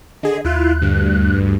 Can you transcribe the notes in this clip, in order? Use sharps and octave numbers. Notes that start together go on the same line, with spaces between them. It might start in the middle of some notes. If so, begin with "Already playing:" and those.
D3 G#4 D#5
D#2 E4 F4 F#6
D2 G2